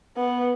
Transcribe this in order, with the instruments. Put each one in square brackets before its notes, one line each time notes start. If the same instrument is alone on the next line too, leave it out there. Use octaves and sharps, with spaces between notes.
[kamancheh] B3